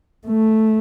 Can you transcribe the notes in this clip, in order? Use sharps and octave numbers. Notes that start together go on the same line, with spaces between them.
A3